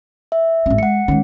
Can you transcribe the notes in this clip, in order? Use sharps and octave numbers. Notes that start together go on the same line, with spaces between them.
E5
G#1 C#4
G#3 F#5 C#7
D#3 G#3 C#4